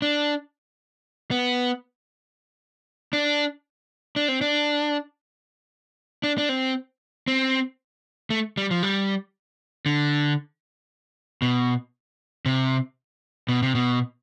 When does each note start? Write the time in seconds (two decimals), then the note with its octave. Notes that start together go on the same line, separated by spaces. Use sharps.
0.02 D4
1.31 B3
3.13 D4
4.16 D4
4.28 C4
4.41 D4
6.24 D4
6.38 D4
6.49 C4
7.28 C4
8.30 A3
8.57 G3
8.71 F3
8.83 G3
9.86 D3
11.42 B2
12.46 C3
13.48 B2
13.62 C3
13.75 B2